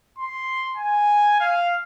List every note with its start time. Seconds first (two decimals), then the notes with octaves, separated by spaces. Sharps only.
0.19 C6
0.77 G#5
1.40 F5